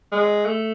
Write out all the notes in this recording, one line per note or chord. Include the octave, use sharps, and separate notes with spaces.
G#3
A3